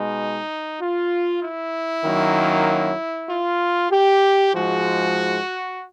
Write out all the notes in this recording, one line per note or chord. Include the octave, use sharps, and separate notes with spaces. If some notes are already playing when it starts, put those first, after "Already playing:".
Already playing: B2 G#3 D#4
F4
E4
F#2 D#3 F#3 A#3
F4
G4
G#2 F3 G#3 F#4